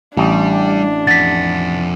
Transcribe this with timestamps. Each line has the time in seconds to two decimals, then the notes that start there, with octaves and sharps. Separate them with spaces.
0.17 A1 G3 D4
1.07 F2 F#5 A6 B6